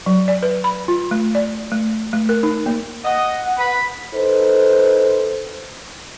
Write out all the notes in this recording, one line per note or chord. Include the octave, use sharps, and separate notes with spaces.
F#3
D5
B4
B5
F4
A3
D5
A3
A3
A#4
D#4
A#3
D#5 F#5
B4 B5
D#4 A4 B4 C5